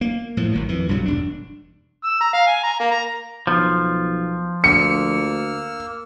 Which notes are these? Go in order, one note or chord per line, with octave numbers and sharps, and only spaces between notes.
A#3
A2 F3
G#1 D#3 F#3
F2 E3
B1 G2 F#3
E1 D4
E6
A#5
F5
G#5
A#5
A#3
A#5
B1 F3
D2 A#3 E6 F6 C#7